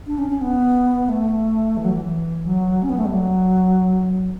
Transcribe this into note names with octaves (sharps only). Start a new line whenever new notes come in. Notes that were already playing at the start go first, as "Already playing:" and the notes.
D4
C#4
C#4
B3
A3
E3
F#3
E3
F#3
C#4
B3
A3
G3
F#3